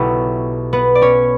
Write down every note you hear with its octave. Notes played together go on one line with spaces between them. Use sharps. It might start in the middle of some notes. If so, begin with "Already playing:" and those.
Already playing: B1 B2 B3 E4 G4 A4 B4
B3 B4
D5
C#4 C#5